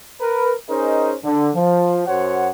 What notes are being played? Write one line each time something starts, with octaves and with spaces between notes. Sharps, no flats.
A#4 B4
C#4 D#4 G#4 A#4 C5 D#5
D3
F3
F#2 F#4 C5 C#5 F#5